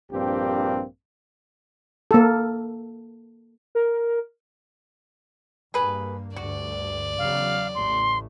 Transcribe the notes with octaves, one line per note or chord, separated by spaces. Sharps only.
A#1 G2 A#3 C4 G4
A#3 A4
A#4
G2 A#3 G#4 B4
D2 G2 F#4 D5
E2 C#3 F#3 F5
A1 A2 A3 C6